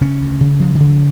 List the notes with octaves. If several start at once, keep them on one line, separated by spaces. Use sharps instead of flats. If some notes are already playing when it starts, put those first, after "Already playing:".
C#3 C#4
D2
C#3
D2 F3
D3
C#3
F3